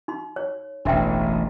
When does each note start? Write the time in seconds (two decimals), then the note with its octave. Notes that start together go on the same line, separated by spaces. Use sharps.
0.08 D#4 C6
0.36 C#5
0.85 E1 A1 D4 E5 G5